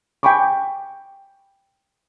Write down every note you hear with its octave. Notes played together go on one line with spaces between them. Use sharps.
G5 G#5 B5 C#6 D6